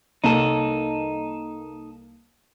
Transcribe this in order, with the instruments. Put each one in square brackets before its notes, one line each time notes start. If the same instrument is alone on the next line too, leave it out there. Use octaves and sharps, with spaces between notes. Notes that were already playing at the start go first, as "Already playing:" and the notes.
[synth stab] C2 A#3 [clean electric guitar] D#4 A4